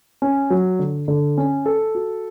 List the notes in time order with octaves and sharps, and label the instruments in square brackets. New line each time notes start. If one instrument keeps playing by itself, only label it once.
[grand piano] C#4
F#3
D3
D3
C#4
A4
F#4